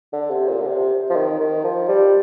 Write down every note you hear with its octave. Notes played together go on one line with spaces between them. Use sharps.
D3
C3
A#2
D3
C3
F3
D#3
D#3
F3
G3